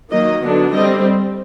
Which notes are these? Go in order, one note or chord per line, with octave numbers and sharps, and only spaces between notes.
D#3 F#3 A#3 D#5
D3 F#3 B3 D4
G3 C4 D#5